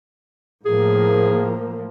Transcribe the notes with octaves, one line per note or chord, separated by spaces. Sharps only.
A2 F3 A#3 G#4